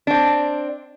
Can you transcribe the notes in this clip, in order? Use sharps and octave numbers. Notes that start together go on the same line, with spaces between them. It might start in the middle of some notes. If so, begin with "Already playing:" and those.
C4 D4